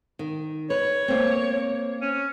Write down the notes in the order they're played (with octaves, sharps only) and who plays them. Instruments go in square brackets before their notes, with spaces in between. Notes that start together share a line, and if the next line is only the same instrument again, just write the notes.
[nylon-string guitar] D#3
[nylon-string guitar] B4 [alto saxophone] C#5
[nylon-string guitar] A#3 C4
[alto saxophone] C#4